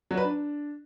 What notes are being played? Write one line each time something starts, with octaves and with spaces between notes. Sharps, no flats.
F#3
B4
D4